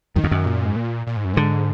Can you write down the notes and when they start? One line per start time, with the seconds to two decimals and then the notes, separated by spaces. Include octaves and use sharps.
0.15 F#2 D#3
0.24 F2
0.31 F#2
0.46 A#2
0.66 G#2
0.76 A#2
1.07 A#2
1.17 G#2
1.25 F#2
1.34 G#2 D3